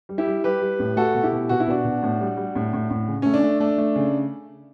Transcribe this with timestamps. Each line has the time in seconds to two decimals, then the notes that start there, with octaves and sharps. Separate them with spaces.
0.09 G3
0.18 E4 G4
0.27 G3
0.44 G3 G4 B4
0.62 G3
0.79 A2
0.96 A3 F#4 A4
1.14 B2
1.23 E4 G4
1.32 B2
1.49 B2 F#4
1.60 E4
1.67 B2 D4 F#4
1.85 B2
2.03 A2
2.20 G3
2.37 G3
2.55 A2
2.73 A2
2.90 A2
3.07 C#3
3.22 A3 C#4
3.34 D4
3.43 A3
3.60 A3 D4
3.78 A3
3.96 C#3